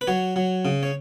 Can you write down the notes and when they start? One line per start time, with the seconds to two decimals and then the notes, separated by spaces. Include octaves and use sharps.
0.01 B4
0.07 F#3 C#5
0.36 F#3
0.65 C#3
0.83 C#5